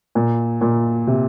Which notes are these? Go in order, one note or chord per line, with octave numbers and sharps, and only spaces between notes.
A#2
A#2
C3